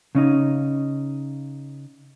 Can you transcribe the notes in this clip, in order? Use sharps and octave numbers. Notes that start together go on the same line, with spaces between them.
C#3 C#4 D#4